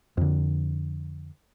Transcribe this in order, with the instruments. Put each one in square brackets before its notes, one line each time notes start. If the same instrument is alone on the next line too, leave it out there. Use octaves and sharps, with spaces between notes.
[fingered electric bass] F2 D3